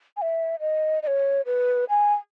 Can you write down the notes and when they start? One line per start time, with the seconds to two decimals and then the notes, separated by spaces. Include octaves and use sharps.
0.17 G#5
0.22 E5
0.60 D#5
1.03 D#5
1.07 C#5
1.46 B4
1.89 G#5